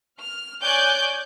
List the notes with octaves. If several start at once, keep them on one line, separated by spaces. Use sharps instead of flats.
F6
C#5 D5 G#5 D6 F#6 G6